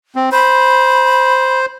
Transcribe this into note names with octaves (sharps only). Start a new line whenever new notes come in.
C4
C5 B5